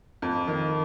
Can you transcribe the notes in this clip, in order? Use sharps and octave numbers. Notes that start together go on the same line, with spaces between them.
F2
D#3